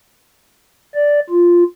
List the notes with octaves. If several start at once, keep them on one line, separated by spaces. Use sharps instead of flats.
D5
F4